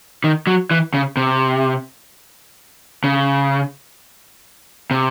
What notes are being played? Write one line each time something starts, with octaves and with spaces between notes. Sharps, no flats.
D#3
F#3
E3
C#3
C3
C#3
C3